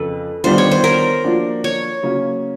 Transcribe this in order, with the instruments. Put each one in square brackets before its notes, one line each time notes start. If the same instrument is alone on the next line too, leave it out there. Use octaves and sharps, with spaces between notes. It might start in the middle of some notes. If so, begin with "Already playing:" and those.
Already playing: [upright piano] F2 C#3 [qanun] A4 B4
[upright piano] D#3 G3 B3 D4 F4 [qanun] C5
[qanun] C#5
C5
A#4
[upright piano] F3 A#3 D4 F#4
[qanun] C#5
[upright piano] C#3 F#3 A#3 C#4